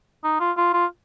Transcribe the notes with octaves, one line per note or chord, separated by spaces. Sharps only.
D#4
F4
F4
F4